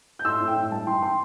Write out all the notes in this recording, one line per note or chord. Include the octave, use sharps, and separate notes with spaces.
G6
A2 C6 E6
A2
G5
E3
G2 A5
E3 G5 C6
E3 G5 C6